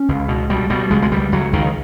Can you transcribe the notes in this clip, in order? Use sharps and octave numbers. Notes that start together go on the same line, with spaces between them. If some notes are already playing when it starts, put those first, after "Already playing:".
Already playing: C#4
C#2
B2
B2 G3
B2 G3
C#2 G#3
G#3
C#2 G3
C#2 F#3
C#2 D#3